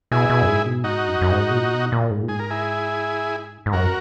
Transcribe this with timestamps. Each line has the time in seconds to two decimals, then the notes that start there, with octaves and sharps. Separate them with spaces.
0.11 B2 E4 G#4
0.29 B2
0.42 F#2
0.48 G#2
0.66 B2
0.84 G#2 D#4 F#4
1.08 F#2
1.21 F#2
1.32 G#2
1.50 B2
1.56 A#2
1.74 B2
1.92 A#2
2.10 G#2
2.23 A#2
2.28 G#2 G#4
2.39 A#4
2.50 E4 G#4
3.66 G#2
3.73 F#2 F#4 A#4